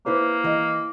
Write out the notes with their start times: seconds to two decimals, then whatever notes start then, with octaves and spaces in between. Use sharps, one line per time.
0.06 A#3 E4 B4 C5
0.44 E3 D#5